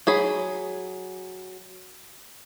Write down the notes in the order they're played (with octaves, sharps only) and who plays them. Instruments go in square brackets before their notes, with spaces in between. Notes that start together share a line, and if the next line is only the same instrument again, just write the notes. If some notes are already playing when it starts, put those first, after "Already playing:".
[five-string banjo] F#3 G#4 B5